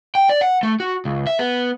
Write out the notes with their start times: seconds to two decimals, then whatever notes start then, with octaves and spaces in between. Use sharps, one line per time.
0.15 G5
0.29 D5
0.41 F#5
0.63 A3
0.80 F#4
1.05 C#2
1.27 E5
1.39 B3